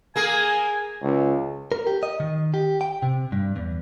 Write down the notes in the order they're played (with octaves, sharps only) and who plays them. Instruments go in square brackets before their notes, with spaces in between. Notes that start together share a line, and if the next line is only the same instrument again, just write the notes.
[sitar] A#3 G#4 [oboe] G#5
[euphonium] C#2
[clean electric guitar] A#4
G4
D#5
D#3
G4
G5
C3
G2
E2